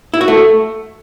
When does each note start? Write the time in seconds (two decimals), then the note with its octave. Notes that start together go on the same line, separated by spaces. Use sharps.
0.14 E4
0.21 F#4
0.28 A3